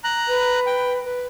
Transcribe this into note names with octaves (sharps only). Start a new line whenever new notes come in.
A#5 F#6
B4
G5
B4